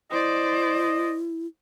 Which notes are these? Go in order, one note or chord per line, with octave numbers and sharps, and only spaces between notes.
E4 C5 D5 D#5